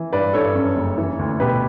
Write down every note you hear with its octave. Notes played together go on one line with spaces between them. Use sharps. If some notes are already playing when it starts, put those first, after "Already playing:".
Already playing: E3
G2 B4 D5
G2 A4 C#5
F#2
F#1
E3
D2
B2 G4 B4